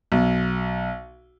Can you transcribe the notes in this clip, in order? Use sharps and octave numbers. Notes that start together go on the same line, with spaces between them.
B1